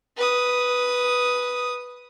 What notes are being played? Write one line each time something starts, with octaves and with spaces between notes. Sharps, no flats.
B4 D#6